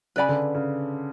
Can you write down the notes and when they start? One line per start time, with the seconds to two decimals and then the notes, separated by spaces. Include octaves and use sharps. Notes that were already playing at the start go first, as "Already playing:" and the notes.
0.16 C#3 B4 D5 G#5 B5
0.29 D3
0.55 C#3